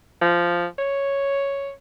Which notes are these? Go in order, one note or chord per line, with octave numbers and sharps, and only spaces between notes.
F3
C#5